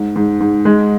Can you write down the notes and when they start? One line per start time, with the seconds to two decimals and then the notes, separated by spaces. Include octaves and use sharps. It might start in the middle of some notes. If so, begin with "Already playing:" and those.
Already playing: G#2
0.16 G#2
0.41 G#2
0.65 G#3